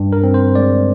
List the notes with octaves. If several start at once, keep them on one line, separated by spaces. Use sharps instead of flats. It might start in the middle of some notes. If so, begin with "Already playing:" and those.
Already playing: G2
A#4
C4
C5
G#3 D5